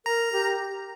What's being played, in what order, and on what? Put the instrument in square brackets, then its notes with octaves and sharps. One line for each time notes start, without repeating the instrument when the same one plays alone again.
[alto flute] A#4 [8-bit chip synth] A#5
[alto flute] G4